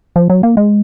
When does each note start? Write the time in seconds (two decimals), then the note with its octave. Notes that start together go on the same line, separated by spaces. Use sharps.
0.16 F3
0.30 F#3
0.43 A#3
0.57 G#3